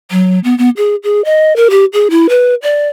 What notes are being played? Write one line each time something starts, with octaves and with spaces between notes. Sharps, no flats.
F#3
B3
B3
G#4
G#4
D#5
A#4
G4
G#4
E4
B4
D5